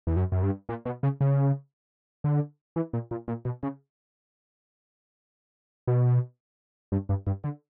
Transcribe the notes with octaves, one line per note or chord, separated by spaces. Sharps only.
E2
F#2
F#2
G2
A#2
B2
C#3
C#3
D3
E3
A#2
A#2
A#2
B2
C#3
B2
G2
G2
G2
D3